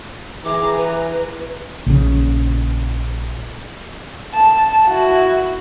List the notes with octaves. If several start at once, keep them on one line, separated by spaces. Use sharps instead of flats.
E3 G4 G#4 A#5 D6
B4
A#1 C#3
A5
E4 F#4